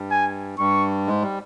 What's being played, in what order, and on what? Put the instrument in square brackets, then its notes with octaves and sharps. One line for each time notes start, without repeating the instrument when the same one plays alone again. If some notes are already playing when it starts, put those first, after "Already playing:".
Already playing: [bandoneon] G2 G3
[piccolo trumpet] G#5
[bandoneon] G2 G3 [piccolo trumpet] C#6
[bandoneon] G#2 G#3
G3